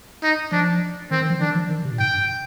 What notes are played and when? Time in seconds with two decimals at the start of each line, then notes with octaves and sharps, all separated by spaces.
0.23 D#4
0.52 F3 D4
1.11 D#3 C4
1.21 D#3
1.30 F3
1.40 D#3 D4
1.55 F3
1.69 D#3
1.85 C3
1.92 A#2
1.99 G#2 G5
2.14 G2